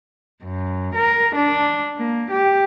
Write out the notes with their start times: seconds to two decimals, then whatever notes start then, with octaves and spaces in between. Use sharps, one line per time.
0.42 F#2
0.94 A#4
1.35 D4
1.97 A#3
2.30 G4